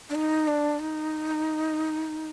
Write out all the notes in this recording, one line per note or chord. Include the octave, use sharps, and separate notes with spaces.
D4
D#4
D4
D#4